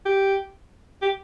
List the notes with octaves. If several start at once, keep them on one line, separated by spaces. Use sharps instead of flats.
G4
G4